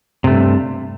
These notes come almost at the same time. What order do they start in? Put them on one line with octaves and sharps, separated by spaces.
C3 A3 G2